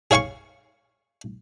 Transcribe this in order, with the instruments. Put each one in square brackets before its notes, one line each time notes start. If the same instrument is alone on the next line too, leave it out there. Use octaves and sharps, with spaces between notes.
[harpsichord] G#4 C#5 F5 G#5 C#6